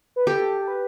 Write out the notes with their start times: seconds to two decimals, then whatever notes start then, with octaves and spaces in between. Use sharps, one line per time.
0.16 B4
0.27 G4 A4
0.62 A4
0.68 B4